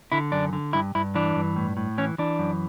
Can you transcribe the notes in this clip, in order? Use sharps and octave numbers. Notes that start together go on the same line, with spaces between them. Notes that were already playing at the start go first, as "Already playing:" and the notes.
D3 E4
F#2 D4
D3
G2 E4
G2 E4
E3 D4
G2
A2
A2
E3 C#4
E3 D4
F#2